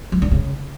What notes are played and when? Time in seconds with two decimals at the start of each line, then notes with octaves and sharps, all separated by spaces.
0.12 F3
0.22 D3
0.31 C#3